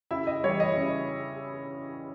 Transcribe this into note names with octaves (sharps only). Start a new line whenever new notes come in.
C#3 E4 E5
D#5
E3 G3 C#5
D#5
C#3